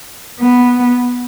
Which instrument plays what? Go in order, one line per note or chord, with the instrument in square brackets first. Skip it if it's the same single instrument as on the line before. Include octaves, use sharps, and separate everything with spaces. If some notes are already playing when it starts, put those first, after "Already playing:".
[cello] B3